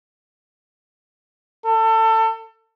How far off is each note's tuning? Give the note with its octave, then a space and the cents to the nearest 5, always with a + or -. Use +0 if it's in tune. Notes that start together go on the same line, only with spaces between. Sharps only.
A4 +25